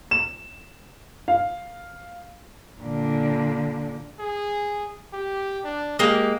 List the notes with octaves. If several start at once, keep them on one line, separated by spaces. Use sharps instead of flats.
E7
F5
A#2 D3
G#4
G4
D4
G#3 A#3 G4